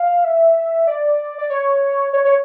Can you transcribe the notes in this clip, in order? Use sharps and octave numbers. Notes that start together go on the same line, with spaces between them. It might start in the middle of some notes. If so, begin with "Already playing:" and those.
Already playing: F5
E5
D5
D5
C#5
C#5
C#5